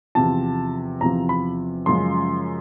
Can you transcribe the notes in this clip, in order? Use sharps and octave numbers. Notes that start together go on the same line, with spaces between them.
E2 C3 F3 A5
E2 C3 F3 A#5
B5
F#2 C#3 F3 G#3 C6